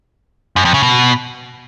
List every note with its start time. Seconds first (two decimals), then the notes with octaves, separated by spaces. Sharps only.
0.56 F#2
0.65 F2
0.74 C#3
0.83 B2